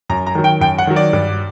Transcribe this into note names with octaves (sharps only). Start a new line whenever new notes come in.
F#2 A#5
A#5
D#3 F#3
G5
F#2 G5
F#5
D#3 F#3
D5
G2